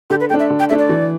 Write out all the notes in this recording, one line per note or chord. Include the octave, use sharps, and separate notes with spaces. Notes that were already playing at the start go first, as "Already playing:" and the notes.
D3 G4
B4
A3 D4 G5
E5
D3
G5
A3 D4 E5
D5
E3